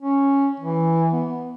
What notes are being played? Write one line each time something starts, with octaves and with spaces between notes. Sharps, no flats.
C#4
E3
B3